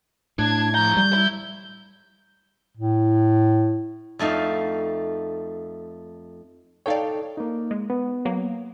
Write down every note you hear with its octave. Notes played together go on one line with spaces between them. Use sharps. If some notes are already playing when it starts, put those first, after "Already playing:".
A2 D4 G#6
F3 A#5 G6
G3 G6
E5 B5
A2
F2 A3 D#4 F5
D#4 A4 C#5 D5 F5 G5
A#3 D#4
G#3
B3
F#3 A#3